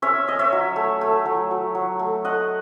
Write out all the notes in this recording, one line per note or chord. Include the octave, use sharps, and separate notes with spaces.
C#4 C#5 E5
C#4 D#5
C#5 E5
F#3
A3
A3
F#3
F#3
F#3
A3
A3 D#5 F#5